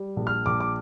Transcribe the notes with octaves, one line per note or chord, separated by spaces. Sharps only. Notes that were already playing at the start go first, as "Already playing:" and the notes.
Already playing: G3
A#1
F6
A#1 D6
D6